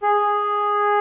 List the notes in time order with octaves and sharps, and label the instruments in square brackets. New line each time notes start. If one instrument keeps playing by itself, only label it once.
[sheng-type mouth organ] G#4